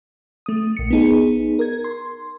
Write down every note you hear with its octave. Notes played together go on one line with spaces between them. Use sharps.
A3 D#6
A#1 C#7
B3 D#4 G#4
A#4 G#6
C6